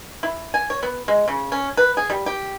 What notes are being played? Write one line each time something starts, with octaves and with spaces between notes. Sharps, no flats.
E4
G#5
C#5
B3
G#3
C#3
C#4
B4
G#4
G3
G4